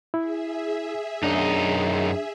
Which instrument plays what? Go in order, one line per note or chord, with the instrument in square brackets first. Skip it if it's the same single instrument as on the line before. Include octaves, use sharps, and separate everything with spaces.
[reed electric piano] E4 [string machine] G#4 E5
[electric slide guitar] F#2 D#4 [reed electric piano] D4